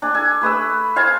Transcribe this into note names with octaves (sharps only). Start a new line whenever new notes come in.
D4 G#5
A4 G#5
A3 B4 D#6 E6
C5 F5 G#5 A5